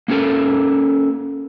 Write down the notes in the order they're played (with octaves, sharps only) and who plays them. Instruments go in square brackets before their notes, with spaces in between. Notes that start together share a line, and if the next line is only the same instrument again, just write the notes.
[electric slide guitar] A#3 C#4 F4 A4 A#4